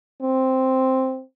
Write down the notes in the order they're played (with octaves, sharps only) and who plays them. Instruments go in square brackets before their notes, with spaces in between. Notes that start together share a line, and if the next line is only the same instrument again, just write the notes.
[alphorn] C4